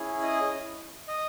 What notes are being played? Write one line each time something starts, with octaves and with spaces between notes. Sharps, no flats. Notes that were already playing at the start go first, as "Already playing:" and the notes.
Already playing: C#4 E4 G#4
D#5
D#5